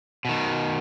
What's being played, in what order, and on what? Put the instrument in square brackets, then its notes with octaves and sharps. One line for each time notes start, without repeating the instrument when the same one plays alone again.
[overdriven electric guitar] B2 D#3